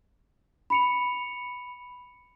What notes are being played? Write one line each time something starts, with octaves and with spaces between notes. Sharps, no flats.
B5 C#7 F7